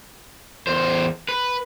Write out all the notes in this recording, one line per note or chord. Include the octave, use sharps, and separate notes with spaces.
E2 C5
B4